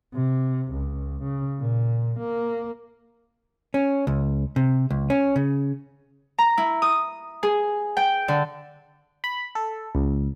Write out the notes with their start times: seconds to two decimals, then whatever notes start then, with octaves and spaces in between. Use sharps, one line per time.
0.14 C3
0.73 C#2
1.23 C#3
1.60 A#2
2.19 A#3
3.74 C#4
4.07 C#2
4.56 C3
4.91 C#2
5.10 C#4
5.36 C#3
6.39 A#5
6.58 E4
6.82 D#6
7.43 G#4
7.97 G5
8.28 D3
9.24 B5
9.55 A4
9.95 C#2